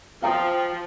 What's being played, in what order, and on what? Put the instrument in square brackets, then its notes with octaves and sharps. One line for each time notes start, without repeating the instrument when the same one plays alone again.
[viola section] F3 [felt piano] F5 A#5 D#6 [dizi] G5